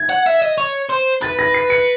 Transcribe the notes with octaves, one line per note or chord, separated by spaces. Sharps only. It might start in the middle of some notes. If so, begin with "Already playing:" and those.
Already playing: G#6
F#5
E5
D#5
C#5
C5
B4 A6
A#6
C7
C#7